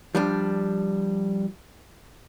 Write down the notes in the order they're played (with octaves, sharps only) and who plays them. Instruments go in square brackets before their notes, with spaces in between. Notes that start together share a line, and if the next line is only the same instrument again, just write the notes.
[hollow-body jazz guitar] F3 G3 D4